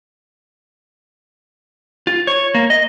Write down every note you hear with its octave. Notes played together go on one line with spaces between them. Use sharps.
F4
C#5
A#3
D#5